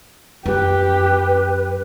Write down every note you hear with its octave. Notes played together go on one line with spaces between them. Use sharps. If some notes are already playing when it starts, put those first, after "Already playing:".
F#2 G4 B4